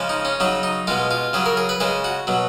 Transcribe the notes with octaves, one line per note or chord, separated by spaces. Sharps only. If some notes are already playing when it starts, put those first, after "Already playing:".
Already playing: C#3 F3 G#3
D#4
C#4
C#3 F#3 D#4
D#4
B2 G#3 F4
F4
C#3 F#3 G#4
A#4
G#4
B4
C#3 G#3 G#4
F#4
B2 F#3